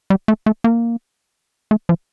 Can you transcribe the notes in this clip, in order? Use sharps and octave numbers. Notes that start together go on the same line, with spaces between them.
G3
A3
A3
A#3
A3
F3